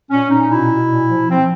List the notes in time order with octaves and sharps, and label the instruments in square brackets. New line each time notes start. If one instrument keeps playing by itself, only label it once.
[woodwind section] A#2 C#4
A#2 D#4
B2 E4
B2
A#2
F3
F3 C4